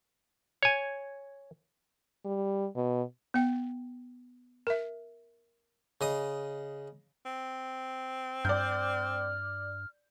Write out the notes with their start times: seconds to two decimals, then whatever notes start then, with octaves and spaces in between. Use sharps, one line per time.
0.63 C#5 G#5
2.25 G3
2.76 B2
3.34 B3 G5
4.67 A#4 E5
6.01 C#3 D#5 D#6
7.25 C4
8.45 G2 D5 F6 G6